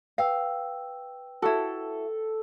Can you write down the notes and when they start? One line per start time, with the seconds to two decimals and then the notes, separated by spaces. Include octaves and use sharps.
0.18 B4 F5 G5 E6
1.42 E4 F#4 A4